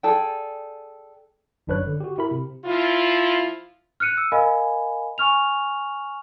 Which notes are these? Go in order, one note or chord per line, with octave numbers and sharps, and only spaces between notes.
G#4 A4 D5 G5
G1 F#2 D4 B4 C#5 F#6
D3
F#4 G4
E4 A#4 B5
C3
F3 E4 F4
F6 F#6 C#7 D#7
E6
A#4 D#5 F5 G#5 B5
G#5 C#6 F6 F7